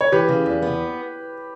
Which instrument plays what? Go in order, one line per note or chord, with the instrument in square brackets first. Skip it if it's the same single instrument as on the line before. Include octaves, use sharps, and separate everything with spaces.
[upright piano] C#5
[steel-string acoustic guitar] E3 [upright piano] G4 B4
[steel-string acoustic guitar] C#3
E2
B3